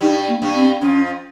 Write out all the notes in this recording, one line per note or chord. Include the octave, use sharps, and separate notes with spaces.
G2 G3 D#4
A#3
G2 G3
C4
F2 F3 C#4